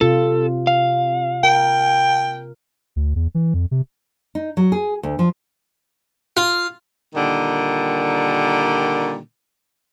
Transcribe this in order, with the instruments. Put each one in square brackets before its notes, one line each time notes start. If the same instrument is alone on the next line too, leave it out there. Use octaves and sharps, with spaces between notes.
[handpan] C3 F4 [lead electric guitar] A4
[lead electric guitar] F5
[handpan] A#4 [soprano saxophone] G5
[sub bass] D2
E2
E3
F2
C3
[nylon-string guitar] D#4
F#3
G#4
D2
F3
[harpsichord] F4
[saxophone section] A#2 D3 D#3 G3